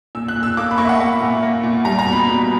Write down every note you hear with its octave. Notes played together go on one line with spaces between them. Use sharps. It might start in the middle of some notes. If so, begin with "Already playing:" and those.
A#2 E6
F#6
A#2
E6
A#3 D6
B5
A#3 C#6
E5
F#5
A#3
A#2
A#3
A#2
G3 A#5
A#5
B2
B5
B2